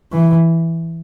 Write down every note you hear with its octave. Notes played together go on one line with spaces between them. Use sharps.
E3